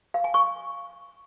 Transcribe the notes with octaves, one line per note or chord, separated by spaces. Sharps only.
F5
G#5
C#6